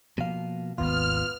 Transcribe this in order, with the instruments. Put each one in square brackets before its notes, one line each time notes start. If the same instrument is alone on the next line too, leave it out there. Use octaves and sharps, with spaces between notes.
[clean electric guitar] B2 F5 [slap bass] F3 A#3
[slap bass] G#1 D#2 C#3 [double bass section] B3 [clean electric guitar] F4 [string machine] F6